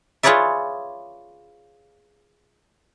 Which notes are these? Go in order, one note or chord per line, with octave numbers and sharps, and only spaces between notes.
F4 G#4 B4 C#5 D5 E5